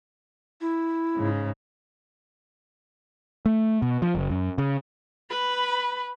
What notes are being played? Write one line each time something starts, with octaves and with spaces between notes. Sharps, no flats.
E4
G#2 C#3
A3
B2
F3
F#1
F#2
C#3
B4 B5